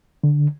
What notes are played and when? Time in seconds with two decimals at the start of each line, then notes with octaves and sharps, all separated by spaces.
0.24 D3